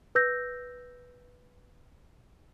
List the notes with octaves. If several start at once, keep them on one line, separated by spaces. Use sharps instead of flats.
B4 E6 G6 A#6